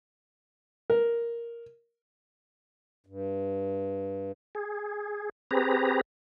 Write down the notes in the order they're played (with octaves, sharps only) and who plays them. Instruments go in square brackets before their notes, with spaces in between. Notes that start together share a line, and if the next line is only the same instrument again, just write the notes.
[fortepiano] A#4
[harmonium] G2
[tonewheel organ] G#4
C4 G4 G#4 B4 A#5